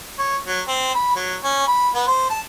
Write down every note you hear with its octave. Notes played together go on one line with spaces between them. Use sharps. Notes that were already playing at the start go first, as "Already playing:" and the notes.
C#5
F#3
C4
B5
F#3
C#4
B5
B3
C5
A5